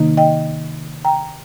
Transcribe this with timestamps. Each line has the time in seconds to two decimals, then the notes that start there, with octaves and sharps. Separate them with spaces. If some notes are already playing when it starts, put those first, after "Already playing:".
Already playing: C3 D#3 A#3 D#4
0.17 D#5 G5
1.05 G5 A#5